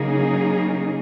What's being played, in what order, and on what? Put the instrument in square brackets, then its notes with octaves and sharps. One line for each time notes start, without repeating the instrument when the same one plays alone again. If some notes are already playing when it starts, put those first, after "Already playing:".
Already playing: [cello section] C#3 F#3 A#3 D#4 G#4